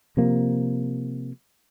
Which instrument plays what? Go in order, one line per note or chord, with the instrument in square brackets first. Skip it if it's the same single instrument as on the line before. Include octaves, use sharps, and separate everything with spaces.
[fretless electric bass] C3 F3 A#3